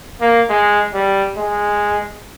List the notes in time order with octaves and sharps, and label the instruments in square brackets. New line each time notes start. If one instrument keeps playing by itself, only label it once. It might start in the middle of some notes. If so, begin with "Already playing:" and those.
[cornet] A#3
G#3
G3
G#3